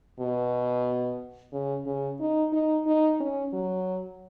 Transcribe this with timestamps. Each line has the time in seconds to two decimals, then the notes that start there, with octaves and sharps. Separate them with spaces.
0.20 B2
1.53 C#3
1.86 C#3
2.20 D#4
2.53 D#4
2.87 D#4
3.20 C#4
3.53 F#3